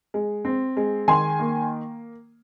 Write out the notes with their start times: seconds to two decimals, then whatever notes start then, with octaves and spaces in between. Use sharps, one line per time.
0.14 G#3
0.45 C4
0.77 G#3
1.08 D#3 G#5 C6
1.40 A#3